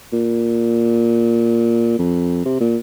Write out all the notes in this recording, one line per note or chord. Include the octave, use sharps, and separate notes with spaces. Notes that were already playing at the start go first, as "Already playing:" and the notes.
A#2
F2
C3
A#2